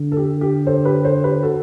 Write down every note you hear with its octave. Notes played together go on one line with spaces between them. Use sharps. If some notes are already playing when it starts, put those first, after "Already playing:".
Already playing: D3
A4
G4
G4
A4 C5
G4 B4
A4 C5
G4 B4
F#4 A4